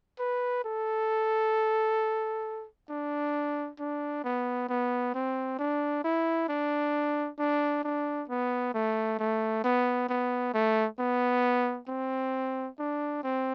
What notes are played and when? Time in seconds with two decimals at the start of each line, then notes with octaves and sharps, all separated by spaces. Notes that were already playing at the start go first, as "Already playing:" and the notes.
0.19 B4
0.64 A4
2.89 D4
3.79 D4
4.24 B3
4.69 B3
5.15 C4
5.59 D4
6.04 E4
6.49 D4
7.39 D4
7.83 D4
8.29 B3
8.74 A3
9.19 A3
9.64 B3
10.09 B3
10.54 A3
10.99 B3
11.88 C4
12.79 D4
13.24 C4